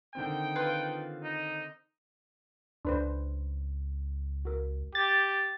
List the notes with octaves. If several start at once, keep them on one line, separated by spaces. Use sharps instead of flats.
D3 D#3 C4 D#4 G5
F4 B4 F5
D#4
C#2 D4 B4 C5
F#4 A#4
G4 A6